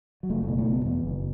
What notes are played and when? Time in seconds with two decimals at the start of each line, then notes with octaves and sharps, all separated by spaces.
0.23 F#3
0.30 F#1 A3
0.43 A3
0.48 B2
0.58 A3
0.67 F#1
0.72 B3
0.85 E2 B3
1.05 F#1